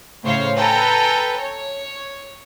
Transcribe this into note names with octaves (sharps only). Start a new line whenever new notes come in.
A2 C#3 C5 C#5 F5
A4 B4 G5 G#5 A#5
C#5